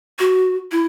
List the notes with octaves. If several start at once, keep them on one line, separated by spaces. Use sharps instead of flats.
F#4
E4